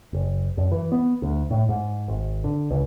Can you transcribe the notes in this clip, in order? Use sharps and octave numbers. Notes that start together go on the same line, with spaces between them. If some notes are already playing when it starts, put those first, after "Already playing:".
F#1
F#2
E3
B3
D2
A2
G#2
G#1
D3
C#2